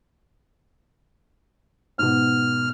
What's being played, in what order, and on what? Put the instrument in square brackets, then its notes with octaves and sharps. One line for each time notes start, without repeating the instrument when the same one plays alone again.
[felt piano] G#2 B2 [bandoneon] F6